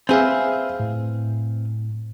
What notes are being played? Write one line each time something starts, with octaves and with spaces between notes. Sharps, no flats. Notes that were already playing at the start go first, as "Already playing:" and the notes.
C4 G#4 B4 E5 F5
A2